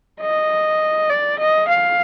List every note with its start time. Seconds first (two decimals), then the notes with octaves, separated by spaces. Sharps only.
0.21 D#5
1.10 D5
1.39 D#5
1.68 F5